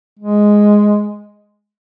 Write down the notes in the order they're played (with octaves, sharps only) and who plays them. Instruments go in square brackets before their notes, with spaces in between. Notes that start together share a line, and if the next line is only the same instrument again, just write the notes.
[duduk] G#3